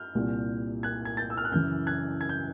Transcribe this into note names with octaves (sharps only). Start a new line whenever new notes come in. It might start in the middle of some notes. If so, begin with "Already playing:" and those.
Already playing: F6 G6
C2 A#2 G3
F#6 G#6
G#6
G6 A6
E6
F6
F#6
F#2 C#3 E3 F6 G6
F#6 G#6
G#6
G6